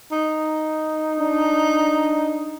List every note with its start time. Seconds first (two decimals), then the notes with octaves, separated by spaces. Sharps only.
0.11 D#4
1.19 D4